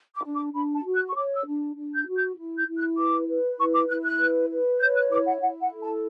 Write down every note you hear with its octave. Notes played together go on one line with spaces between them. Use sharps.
D6
D4
D6
D4 B5
A5
F#4
F#6
C#6
C#5 D6
E6
D4
D4
G6
F#4
G6
E4
G6
E4
F#6
B4 D6
B4
E4 C#6
D6
E4 F#6
F#6
B4
B4
C#5 G6
F#6
E4 D6
F#5
E4 F#5
F#5
A4
A5